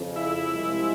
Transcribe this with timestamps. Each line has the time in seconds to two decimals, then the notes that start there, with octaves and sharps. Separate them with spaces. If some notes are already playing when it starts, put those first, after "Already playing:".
Already playing: F2 C#3 F3
0.16 E4
0.52 C2 C3 F3 G#3